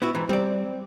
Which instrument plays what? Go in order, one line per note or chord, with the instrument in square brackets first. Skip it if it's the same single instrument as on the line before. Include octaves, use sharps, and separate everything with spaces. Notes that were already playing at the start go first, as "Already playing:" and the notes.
[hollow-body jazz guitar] B3 E4 F#4
G#2 E3
[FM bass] G3 [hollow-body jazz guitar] C4 D5